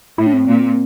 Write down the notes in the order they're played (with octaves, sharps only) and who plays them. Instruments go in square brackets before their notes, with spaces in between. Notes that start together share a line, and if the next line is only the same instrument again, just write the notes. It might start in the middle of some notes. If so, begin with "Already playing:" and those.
[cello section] A2 [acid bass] E4
[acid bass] D4
C4
[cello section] A#2